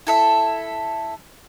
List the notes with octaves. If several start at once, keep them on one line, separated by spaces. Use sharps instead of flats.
E4 A4 E5